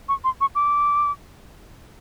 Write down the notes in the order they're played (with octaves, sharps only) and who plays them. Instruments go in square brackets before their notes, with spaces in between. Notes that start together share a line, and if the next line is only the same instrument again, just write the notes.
[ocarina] C#6
C6
C#6
D6